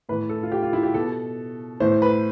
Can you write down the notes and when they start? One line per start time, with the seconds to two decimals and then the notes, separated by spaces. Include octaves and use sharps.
0.09 A2 E3 B4
0.29 A4
0.43 F4
0.52 G4
0.62 F4
0.73 E4
0.83 G4
0.94 B2 A4
1.80 A2 E3 C5
2.02 B4